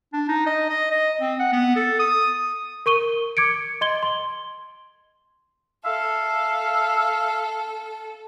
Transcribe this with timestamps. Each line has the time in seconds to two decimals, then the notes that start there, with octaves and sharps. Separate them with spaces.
0.13 D4
0.28 D#4
0.46 D#5
0.70 D#5
0.91 D#5
1.21 C4
1.39 F#5
1.52 B3
1.76 A4
1.99 D#6
2.86 A#4 C#6 D#7 G7
3.37 D6 G#6 C#7 D7
3.81 D#5 C6 G#6 G7
4.03 C6
5.85 A4 E5 F5